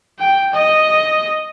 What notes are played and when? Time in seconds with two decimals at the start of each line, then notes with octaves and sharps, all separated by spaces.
0.19 G5
0.54 D#5